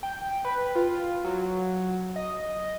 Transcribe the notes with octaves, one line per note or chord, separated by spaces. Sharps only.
G5
B4
F4
F#3
D#5